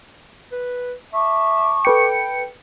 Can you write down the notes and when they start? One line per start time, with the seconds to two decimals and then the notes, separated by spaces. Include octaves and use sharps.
0.52 B4
1.13 E5 A5 C#6 D6
1.85 A4 B4 G5 C#7